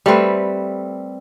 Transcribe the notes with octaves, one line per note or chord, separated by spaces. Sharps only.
G3 A3 C4 B4